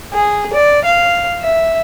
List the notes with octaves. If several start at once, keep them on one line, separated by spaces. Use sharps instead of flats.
G#4
D5
F5
E5